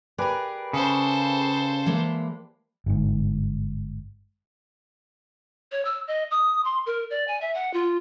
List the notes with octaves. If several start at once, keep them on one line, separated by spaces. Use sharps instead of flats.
G4 G#4 A#4 B4 D5
C#3 A4 C5
E3 G#3 A#3
G1 G#2
C#5
E6
D#5
D#6
C6
A#4
D5
G#5
E5
F#5
F4